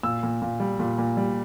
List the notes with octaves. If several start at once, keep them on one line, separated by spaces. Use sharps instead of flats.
A#2 E6
A#2
A#2
G3
A#2
A#2
G3